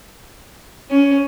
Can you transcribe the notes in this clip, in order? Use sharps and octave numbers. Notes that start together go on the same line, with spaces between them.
C#4